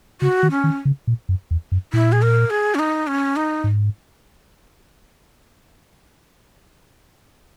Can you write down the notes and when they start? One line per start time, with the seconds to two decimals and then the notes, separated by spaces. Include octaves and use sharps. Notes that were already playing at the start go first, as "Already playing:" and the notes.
0.21 C#3 F#4
0.43 D#3
0.51 C#4
0.64 D#3
0.85 C#3
1.07 A#2
1.29 F#2
1.51 E2
1.72 F#2
1.93 A#2 E4
2.12 G#4
2.22 A#4
2.50 G#4
2.75 C#4
2.79 D#4
3.07 C#4
3.36 D#4
3.64 G#2